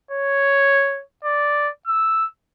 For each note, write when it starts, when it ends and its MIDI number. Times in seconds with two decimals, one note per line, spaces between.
0.11 1.02 73
1.25 1.70 74
1.87 2.27 88